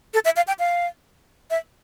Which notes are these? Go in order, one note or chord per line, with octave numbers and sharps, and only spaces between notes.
A4
E5
F5
G5
F5
E5